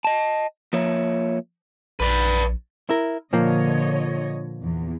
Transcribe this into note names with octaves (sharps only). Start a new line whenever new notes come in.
D#5 A5
F3 A#3 C#5 E5
A#1 B4 D5
E4 A#4
A#2 D3 F3 A#3 C#5 D#5
E2